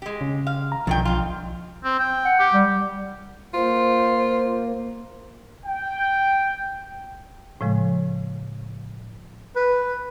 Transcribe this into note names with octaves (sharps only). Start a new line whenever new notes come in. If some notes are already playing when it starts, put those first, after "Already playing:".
G#3 G4
C#3
F5
A#5
B1 G2 D#3 F3 G5
G#2 F4
C4
G5
F#5
G4
G3
A#3 F4 C5
G5
A2 C#3 F3 G#3
B4